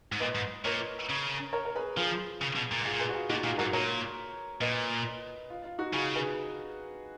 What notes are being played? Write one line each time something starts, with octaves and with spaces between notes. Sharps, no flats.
G#2
A#2 B4 D#5
G#2
A#2 A#4 C#5
C#3
A#4 C#5
A#4
G#4 B4
F3 F4 G#4
C#3
B2
A#2
G#2 F4 G#4
A#2
G#4 B4
F#4
F4 G#4
A#2 D#4 F#4
A#2 F4 G#4
G#2 F#4 A#4
A#2 A#4 C#5
A#2 B4 D#5
F4
F4
D#4 F#4
C#3 F4 G#4
G#4 B4